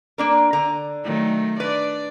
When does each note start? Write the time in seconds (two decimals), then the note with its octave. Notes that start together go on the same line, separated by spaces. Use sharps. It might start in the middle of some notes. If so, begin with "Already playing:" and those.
0.18 A#3 D4 A#4
0.53 D3 A#5
1.03 D#3 F#3 A3
1.60 D4 B4 D5